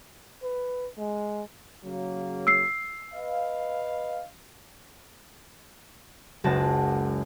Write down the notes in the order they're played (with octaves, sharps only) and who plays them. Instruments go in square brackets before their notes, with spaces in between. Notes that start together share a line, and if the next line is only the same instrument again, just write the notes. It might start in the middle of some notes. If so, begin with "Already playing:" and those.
[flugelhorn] B4
G#3
[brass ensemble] C#3 F#3 A#3
[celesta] E6 C7
[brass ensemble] B4 D#5 F5
[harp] F#1 C#2 F#2 A5 A#6